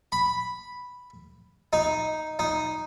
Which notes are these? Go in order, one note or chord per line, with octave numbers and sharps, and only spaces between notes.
B5
D#4
D#4